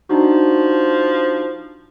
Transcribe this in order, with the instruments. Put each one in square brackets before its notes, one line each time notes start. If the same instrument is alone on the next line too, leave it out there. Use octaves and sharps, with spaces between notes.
[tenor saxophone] F3 [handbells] D4 D#4 F#4